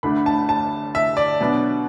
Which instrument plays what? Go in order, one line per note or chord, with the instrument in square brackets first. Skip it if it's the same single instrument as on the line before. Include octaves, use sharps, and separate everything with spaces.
[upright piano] D2 D3 A3 D4 B5
A5
A5
E5
D5
B2 F#3 B3 D4